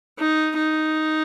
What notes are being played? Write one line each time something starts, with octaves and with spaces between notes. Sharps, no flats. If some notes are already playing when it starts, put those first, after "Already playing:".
D#4
D#4